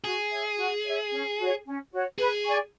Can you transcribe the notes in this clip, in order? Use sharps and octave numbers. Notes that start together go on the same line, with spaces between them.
F#4 G#4
C#5 E5
F#4
C#5 E5
C#4
F#4 C#5
C#4
F#4 C#5
G#4 B4
D5 G#5 C#6